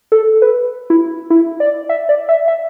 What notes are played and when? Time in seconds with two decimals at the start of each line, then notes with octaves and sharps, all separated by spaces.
0.12 A4
0.42 B4
0.90 E4
1.30 E4
1.60 D5
1.89 E5
2.09 D5
2.29 E5
2.48 E5